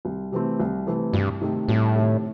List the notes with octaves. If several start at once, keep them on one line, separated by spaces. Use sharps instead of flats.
C2
C3 E3 A3 C4
C2
C3 E3 A3 C4
C2 G2
C3 D#3 A3
C2 A2
C3 D#3 A3